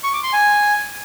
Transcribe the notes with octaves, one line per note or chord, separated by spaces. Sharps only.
C#6
D6
C6
G#5